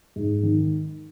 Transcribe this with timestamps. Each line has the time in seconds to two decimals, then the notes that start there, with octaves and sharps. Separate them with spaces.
0.16 G#2
0.43 D#3